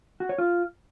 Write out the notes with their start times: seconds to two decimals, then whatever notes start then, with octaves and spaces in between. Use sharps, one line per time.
0.20 F#4
0.29 C#5
0.38 F4